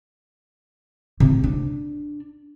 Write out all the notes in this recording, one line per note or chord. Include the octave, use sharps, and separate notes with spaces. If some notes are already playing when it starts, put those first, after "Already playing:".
C3
D4